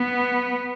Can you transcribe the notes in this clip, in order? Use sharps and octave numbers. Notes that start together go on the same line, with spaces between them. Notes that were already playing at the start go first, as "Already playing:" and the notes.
Already playing: B3